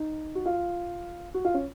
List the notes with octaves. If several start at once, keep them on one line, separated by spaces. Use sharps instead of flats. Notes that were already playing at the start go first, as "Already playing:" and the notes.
Already playing: D#4
F#4
F4
F#4
F4
C#4